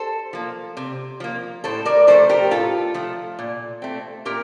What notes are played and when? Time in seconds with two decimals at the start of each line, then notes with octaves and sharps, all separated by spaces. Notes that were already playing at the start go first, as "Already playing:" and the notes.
Already playing: A4 C5
0.33 F3 A#3
0.77 C3
1.20 F3 A#3
1.64 A2 A4 C5
1.85 A#4 D5
2.07 F3 A3 A4 C5
2.29 G4 A#4
2.51 A2 F4 A4
2.94 F3 A3
3.39 A#2
3.82 A3 C4
4.25 A#2 G4 A#4